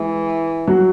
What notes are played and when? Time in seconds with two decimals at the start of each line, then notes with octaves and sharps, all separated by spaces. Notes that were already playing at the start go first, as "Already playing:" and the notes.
Already playing: E3 G#3 G#4
0.67 F#3 F#4